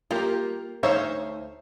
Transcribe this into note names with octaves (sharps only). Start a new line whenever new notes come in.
A#3 F4 G4 A#4
D2 D#4 C5 C#5 E5 F5